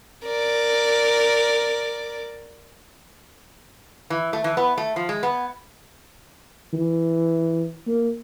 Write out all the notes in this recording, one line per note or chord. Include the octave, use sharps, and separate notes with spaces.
A#4 D5
E3
A3
E3
B3
A3
F3
G#3
B3
E3
A#3